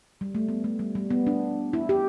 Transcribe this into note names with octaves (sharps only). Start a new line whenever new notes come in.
G3
A3
B3
A3
G3
G3
B3
D4
E4
G4